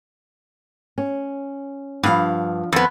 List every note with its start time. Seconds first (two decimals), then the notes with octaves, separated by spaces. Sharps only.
0.98 C#4
2.03 G2 F3 F5 F#5
2.72 F2 B3